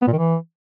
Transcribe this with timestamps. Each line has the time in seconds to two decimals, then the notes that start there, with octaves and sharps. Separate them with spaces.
0.02 B3
0.07 A#2
0.13 D#3
0.18 E3